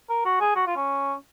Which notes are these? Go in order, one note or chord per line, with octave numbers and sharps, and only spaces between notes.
A#4
F#4
G#4
F#4
F4
C#4